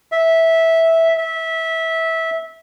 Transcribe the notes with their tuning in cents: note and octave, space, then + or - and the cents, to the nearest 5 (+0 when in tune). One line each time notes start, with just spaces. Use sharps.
E5 -10
E5 -20